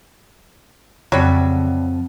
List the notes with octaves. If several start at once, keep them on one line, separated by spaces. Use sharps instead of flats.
F2 C#3 F#3 G3 C4 E5 A5